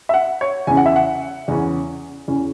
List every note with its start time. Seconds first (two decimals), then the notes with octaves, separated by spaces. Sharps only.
0.09 E5
0.14 F#5
0.41 C#5
0.67 E2 C#3 E3 C#4 G#5
0.77 F#5
0.86 E5
0.96 F#5
1.48 E2 C#3 E3 C#4
2.28 E2 C#3 E3 C#4